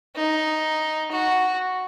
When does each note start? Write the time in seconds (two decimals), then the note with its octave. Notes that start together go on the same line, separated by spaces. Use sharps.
0.16 D#4
1.12 F#4